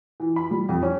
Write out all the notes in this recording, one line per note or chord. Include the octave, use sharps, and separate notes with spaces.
E3
B5
G3
F2
C#4